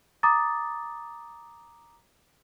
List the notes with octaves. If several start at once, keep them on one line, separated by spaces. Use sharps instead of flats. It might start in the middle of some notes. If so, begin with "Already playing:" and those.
A#5 D6 D#6 A6